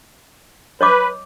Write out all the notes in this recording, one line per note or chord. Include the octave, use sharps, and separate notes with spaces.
B4 C#5 D#5 D6